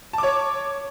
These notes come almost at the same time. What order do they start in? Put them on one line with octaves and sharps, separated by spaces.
A5 D6 C#5